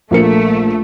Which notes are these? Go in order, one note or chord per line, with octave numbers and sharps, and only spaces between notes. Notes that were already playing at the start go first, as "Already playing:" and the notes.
A#1 A3 A#3 C#7